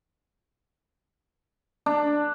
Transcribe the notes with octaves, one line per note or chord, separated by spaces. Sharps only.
D4